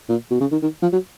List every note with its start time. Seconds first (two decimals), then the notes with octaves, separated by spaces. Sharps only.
0.09 A#2
0.31 B2
0.41 C#3
0.52 D#3
0.62 D#3
0.82 F3
0.93 F#3